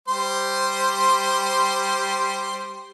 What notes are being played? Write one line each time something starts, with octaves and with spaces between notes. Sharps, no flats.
G3 C5 C6